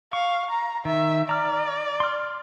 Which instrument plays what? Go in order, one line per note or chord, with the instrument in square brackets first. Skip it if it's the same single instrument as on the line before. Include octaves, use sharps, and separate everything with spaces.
[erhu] F5 [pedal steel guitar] C#6
[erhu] A#5
[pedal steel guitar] D#3 [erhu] E5
[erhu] D5 [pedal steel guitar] A#5 F6
[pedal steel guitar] C6 F6